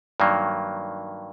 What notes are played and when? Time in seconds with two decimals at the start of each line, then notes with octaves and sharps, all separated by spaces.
0.20 G2 D#3 F#3 A#3